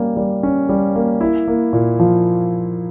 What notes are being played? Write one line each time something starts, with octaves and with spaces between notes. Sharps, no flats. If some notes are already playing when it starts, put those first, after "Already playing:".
Already playing: G3 A#3 C#4
G3
C#4
G3
A#3
E4
A#3
A#2
F3